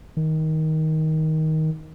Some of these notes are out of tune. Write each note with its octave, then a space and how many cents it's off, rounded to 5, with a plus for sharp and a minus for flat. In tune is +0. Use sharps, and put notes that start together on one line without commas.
D#3 +15